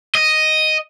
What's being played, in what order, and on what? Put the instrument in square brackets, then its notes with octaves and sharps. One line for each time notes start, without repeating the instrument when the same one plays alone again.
[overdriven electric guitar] D#5